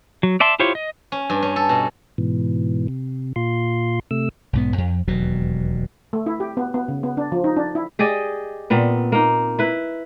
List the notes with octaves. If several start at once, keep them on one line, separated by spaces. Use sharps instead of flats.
F#3
D5 E5 A5 C6
E4 F4 G4 C5 C#5
D#5
C#4
G2
C#4
A4
B2
G#2 B2 E3
C3
A#2 F4 C6
C3 A3 E6
B1 G#2 B3
F2
E1 D#2 B2 F#3
A3
E4
G4
B3
B3
C#3
B3
D4
F3
D#4
D4
E4
G4 G#4 D5 D#5
A#2 B3 C4
A#3 D#4
E4 B4